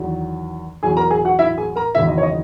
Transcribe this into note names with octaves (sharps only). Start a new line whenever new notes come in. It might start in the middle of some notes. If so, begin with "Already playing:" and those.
Already playing: E2 D#3 F#3
E2 B2 F#3 G#4 G#5
A#4 A#5
G#4 G#5
F#4 F#5
E4 E5
G#4 G#5
A#4 A#5
F#1 E2 D#3 F#3 E4 E5
D#5
C#5
D#5